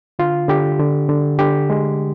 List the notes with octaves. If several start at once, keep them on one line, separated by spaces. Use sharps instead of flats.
D3 F4
D3 G4
D3
D3
D3 G4
G#3